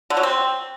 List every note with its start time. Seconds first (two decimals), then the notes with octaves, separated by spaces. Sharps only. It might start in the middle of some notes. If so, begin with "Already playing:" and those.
0.10 D3
0.17 F#3
0.23 C4